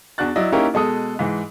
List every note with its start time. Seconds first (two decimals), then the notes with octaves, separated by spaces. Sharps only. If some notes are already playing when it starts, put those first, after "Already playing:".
0.18 E2 D4 F#4 F#6 A6
0.36 F#3 E4 D5 D#5
0.52 A#3 C#4 D#4 E4 G4 A#4
0.74 B2 G#3 A4 D#6
1.19 G#2 E3